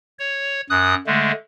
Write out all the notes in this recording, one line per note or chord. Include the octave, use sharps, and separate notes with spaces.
C#5
F#2 D#6 F#6
D3 G#3 A3